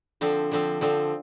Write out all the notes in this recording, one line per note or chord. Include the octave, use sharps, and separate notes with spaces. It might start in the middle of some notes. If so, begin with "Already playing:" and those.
D3 F3 C4
D3 F3 C4
D3 F3 C4